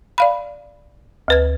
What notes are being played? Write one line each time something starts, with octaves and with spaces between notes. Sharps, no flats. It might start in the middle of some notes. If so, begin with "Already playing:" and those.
D5 F5 B5
D2 B4 G#6